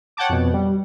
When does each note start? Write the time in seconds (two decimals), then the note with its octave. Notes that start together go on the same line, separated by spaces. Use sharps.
0.17 C#5 F#5 G5 A5 D6
0.29 F2 B2
0.53 G3